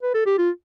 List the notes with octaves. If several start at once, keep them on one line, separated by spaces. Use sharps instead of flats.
B4
A4
G4
F4